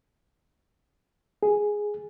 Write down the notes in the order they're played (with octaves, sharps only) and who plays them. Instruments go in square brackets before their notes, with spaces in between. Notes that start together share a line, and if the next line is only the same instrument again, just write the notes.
[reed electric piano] G#4